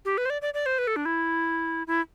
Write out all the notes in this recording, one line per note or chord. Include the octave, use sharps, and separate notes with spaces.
G4
B4
C5
D5
D5
D5
C5
B4
A4
D4
E4
E4